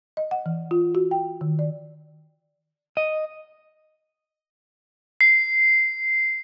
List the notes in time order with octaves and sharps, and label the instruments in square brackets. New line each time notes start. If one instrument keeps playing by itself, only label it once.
[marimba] D#5
F#5
E3
F4
F#4
G5
D#3
D5
[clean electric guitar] D#5
[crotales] C7